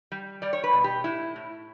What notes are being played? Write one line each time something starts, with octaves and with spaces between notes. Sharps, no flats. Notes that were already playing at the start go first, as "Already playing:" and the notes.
G3
G3 D5
C#5
B4
B2
G4
A2 E4
A2